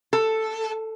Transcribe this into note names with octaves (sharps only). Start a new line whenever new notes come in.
A4